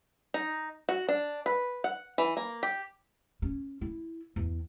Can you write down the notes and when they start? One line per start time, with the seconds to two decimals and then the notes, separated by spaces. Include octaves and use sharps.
0.34 D#4
0.89 F#4
1.09 D4
1.46 B4
1.84 F#5
2.18 E3
2.37 A#3
2.63 G4
3.42 C#4
3.81 E4
4.36 E2